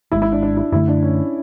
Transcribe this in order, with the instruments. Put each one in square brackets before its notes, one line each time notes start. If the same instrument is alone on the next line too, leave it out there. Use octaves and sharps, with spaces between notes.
[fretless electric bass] G#1 G#2 G#3 [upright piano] E4
[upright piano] E4
D4
D4
E4
[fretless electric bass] F#2 D3 A3 [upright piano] E4
[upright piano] D4
C#4